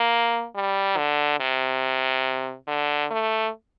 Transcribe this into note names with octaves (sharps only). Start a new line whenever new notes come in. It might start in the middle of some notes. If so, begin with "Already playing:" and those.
Already playing: A#3
G3
D3
C3
D3
A3